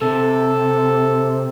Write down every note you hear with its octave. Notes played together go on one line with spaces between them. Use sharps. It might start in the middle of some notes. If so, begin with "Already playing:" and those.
C3 A4